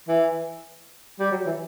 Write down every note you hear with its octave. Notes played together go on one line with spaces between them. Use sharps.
E3
G3
F#3
E3